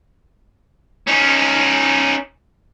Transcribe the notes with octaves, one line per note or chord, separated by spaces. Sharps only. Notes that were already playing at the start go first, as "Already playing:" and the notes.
C#4 D#4